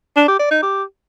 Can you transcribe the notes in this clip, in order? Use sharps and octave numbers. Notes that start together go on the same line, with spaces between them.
D4
G4
D5
D#4
G4